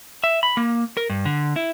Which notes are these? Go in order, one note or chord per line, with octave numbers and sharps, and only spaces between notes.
E5
B5
A#3
A#4
G2
D3
E4